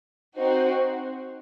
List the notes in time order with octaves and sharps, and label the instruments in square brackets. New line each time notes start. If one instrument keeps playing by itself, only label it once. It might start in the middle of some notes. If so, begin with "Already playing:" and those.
[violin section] C4 D#4 F#4 C5